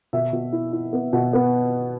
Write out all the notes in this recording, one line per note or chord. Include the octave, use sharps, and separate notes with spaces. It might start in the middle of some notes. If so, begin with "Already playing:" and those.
B2 E5
B2
E4
E4
B3
B2
B3